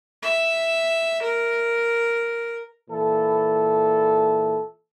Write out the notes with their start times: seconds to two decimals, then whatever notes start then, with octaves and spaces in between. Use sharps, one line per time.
0.22 E5
1.22 A#4
2.90 A#2 E3 A4